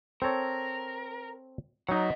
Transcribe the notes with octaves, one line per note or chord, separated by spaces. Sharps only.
C4 A4 A#4 C#5
F#3 D#4 D#5 F#5